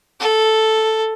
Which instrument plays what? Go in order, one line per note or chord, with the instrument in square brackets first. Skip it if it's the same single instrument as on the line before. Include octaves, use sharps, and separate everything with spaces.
[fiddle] A4